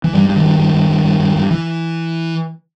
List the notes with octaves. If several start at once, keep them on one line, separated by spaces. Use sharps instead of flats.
E3
G2 G3
G2
D#3
G2
G2
G2
G2
G2
G2
G2
E3